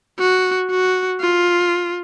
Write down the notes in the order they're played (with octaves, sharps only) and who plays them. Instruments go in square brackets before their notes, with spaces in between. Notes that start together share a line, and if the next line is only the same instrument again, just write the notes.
[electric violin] F#4
F#4
F4